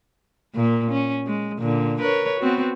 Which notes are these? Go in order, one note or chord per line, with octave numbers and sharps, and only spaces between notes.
A#2 A#3
C#4
G#3
A#2 D3
A#4 B4 C#5
B3 C4 F#4